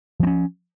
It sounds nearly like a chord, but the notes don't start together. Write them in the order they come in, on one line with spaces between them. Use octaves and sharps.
F3 C4 C#4